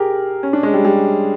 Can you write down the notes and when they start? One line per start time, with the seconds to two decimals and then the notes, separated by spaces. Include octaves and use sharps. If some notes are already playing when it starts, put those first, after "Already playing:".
Already playing: G4 G#4 A#4
0.43 C#4
0.53 D4
0.63 G#3
0.74 G3
0.85 G3